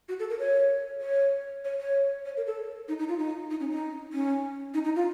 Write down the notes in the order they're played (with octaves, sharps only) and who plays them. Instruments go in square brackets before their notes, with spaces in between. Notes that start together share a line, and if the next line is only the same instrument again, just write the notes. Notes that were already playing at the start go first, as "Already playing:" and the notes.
[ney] F#4
A4
A#4
C#5
C#5
C#5
C#5
C#5
A#4
A4
D#4
D#4
F4
D#4
D#4
C#4
D#4
C#4
D#4
D#4
F4